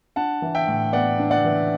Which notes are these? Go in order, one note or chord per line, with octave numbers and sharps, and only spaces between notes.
D4 F#5 A5
E3
E5 G5
A2
B3 D5 F#5
D4
D5 F#5
E3